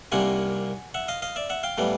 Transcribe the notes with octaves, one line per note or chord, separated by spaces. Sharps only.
C2 C3 D#3 G3 A#3 F#5 G#5
E5 F#5
D#5 F5
D#5 F5
D5 E5
E5 F#5
F5 G5
A2 E3 G3 B3